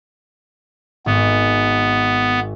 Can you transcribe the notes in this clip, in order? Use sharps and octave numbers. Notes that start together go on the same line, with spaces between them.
G#1 B3